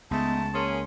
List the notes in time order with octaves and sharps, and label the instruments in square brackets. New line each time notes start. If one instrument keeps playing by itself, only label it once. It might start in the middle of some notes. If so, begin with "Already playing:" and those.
[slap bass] C#2 [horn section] G#3 A3 D#4 [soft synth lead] B3 [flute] A5
[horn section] A#3 C#4 G#4 [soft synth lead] C6